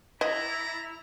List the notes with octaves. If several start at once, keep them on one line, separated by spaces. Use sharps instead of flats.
E4 D5 D#5 A#5